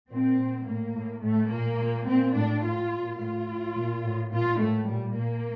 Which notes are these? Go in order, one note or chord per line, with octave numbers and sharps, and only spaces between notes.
A#2 C4
A#2
A2 A#3
A2
A2 A3
A#2 A#3
A#2
A#2 C4
A2 D4
A2 F4
A#2
A2 F4
A2
A#2
A2
A#2 F4
A2 A3
A#2 G3
A#2 A#3